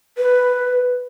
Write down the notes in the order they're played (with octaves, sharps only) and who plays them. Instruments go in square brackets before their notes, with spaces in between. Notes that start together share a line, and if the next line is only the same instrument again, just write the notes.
[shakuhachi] B4